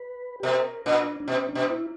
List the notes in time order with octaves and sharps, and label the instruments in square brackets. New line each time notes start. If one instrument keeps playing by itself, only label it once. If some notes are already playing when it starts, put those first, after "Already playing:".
Already playing: [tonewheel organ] B4
G4
[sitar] B2 [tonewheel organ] A#4
[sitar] A#2 [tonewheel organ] D4
[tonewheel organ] D4
[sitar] B2 [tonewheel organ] C#4
[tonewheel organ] D4
[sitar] B2
[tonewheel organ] E4